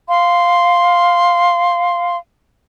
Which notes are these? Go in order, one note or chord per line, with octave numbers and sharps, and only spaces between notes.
F5 C6